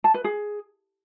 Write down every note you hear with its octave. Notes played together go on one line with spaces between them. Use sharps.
A5
B4
G#4